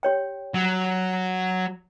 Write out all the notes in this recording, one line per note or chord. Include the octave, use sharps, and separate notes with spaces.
G4 C#5 G5
F#3